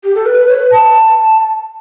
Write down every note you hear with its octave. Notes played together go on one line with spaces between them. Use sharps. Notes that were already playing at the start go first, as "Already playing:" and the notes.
G4
A4
B4
B4
C#5
B4
A5